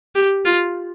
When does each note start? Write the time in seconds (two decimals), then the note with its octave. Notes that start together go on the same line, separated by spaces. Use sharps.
0.15 G4
0.45 F4